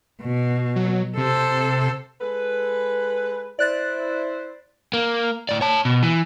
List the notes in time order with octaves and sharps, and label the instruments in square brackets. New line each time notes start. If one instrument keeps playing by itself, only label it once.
[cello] B2
[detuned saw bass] F#3
[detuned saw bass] C3 [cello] A4 C5
[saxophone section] G#3 A4 B4
[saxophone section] E4 C5 [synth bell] D5 F#6 A6
[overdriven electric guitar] A#3
A2 D5
C#5 A5
B2
E3